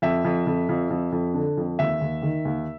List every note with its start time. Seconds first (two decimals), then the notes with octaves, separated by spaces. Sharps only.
0.02 F2 E5
0.24 F2
0.47 F2
0.69 F2
0.90 F2
1.12 F2
1.34 D3
1.57 F2
1.79 D#2 E5
2.01 D#2
2.22 D#3
2.45 D#2